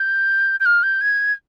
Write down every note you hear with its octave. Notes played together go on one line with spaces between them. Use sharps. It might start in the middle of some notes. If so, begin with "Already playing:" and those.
Already playing: G6
G6
F6
G6
G#6